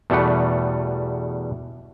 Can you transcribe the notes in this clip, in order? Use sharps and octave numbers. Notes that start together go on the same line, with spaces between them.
E2 B2 G3 A3 F#5